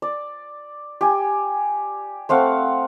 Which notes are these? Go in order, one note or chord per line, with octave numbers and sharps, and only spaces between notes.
D5
G4 G#5
A3 C4 F5 F#5